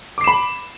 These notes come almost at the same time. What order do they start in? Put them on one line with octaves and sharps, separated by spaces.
D6 C7 E7 B5